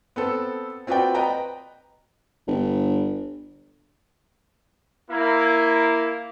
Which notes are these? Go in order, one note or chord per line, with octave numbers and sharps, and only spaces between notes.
B3 C4 A4
C4 F4 F#4 B4 D5 G5
B4 D#5 G5 A#5
G1
A#3 E4